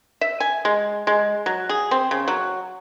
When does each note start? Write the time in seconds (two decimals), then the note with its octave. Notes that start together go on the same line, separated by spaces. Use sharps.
0.21 E5
0.40 G#5
0.65 G#3
1.07 G#3
1.46 F#3
1.69 G#4
1.91 C4
2.11 C#3
2.28 F#3